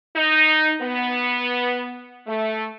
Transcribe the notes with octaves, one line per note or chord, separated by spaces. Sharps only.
D#4
B3
A3